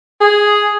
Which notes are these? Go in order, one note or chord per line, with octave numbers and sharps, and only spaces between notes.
G#4